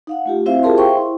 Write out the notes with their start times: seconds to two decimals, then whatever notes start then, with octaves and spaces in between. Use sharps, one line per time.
0.07 D#4 F5 F#5
0.26 A3 F4 G4
0.46 C4 E4 F#4 C5 E5 F5
0.63 F4 G4 G#4 A#4 A5 C6
0.77 C5 E5 F5 G5 C6 C#6
0.97 E4